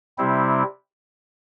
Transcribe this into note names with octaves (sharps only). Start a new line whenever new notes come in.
C3 G3 C4 E4